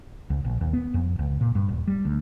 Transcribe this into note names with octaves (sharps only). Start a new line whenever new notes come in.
C#2
A#1
D#2
B3
F2
C#2
A#2
G2
D#1
G3
D2